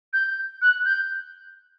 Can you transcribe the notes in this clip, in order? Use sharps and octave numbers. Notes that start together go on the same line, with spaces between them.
G6
F#6
G6